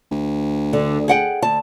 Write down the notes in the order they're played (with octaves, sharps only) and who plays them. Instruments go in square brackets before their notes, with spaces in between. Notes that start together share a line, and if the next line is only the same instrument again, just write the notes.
[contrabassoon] D2
[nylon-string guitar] D3
G#4 F#5 G5
D2 A5